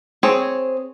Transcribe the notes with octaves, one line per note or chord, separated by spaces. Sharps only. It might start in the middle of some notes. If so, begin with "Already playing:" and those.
C4 G#4 C#5